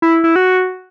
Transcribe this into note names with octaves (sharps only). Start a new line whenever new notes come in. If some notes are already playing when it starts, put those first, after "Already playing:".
E4
E4
F#4